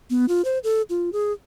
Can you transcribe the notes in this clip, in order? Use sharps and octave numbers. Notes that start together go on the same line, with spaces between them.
B3
F4
C5
A4
F4
G#4